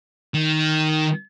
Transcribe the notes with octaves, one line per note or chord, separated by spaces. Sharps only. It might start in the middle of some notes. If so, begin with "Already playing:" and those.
D#3